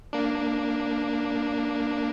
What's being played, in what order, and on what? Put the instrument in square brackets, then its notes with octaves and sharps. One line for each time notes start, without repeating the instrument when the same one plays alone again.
[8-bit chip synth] A#3 D4